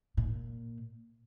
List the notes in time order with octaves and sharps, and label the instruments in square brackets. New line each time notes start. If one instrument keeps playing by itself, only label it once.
[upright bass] A#2